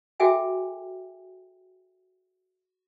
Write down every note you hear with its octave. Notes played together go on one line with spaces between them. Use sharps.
F#4 G#4 A4 E5 G5 G#5